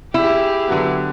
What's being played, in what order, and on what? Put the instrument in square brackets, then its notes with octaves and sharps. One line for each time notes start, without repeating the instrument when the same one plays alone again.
[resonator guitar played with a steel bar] E4 [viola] G4 G#4
[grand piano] D3 F#3 B3